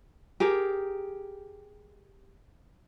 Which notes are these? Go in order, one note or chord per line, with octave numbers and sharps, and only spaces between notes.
G4 G#4 A#4